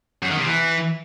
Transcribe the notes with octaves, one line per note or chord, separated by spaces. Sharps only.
F#2
D#3
C3
E3